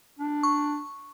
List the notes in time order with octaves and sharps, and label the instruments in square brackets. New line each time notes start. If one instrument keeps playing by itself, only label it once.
[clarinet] D4
[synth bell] C#6